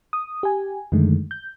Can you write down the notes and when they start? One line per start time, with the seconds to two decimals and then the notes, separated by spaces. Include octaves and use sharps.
0.13 D#6
0.43 G4 G#5
0.92 F#2 D3 D#3 G#3 A3
1.31 G6